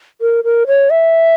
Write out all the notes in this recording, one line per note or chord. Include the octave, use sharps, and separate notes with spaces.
A#4
A#4
C#5
E5